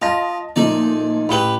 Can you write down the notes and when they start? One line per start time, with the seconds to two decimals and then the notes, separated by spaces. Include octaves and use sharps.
0.02 F4 D#5 A5 A#6
0.56 A#2 F3 A3 D#4 D5
1.29 A1 G4 B4 B5 F#7